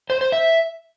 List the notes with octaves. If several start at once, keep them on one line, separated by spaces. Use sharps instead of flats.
C5
C5
E5